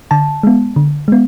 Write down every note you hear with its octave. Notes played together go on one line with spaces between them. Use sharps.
D3 A5
G#3 B3
D3
G#3 B3